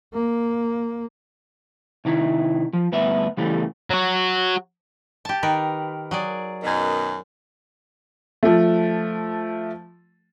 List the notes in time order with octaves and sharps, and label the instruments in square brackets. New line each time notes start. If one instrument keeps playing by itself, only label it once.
[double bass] A#3
[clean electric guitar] C3 D#3 E4
F3
D2 G2 B3 B4 E5
C#3 E3 G3 A3
[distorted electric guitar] F#3 F#4
[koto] G4 A5
D#3 A#4 B4
F#3 G#4 D5
[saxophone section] F#2 B2 D#3
[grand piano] F3 A3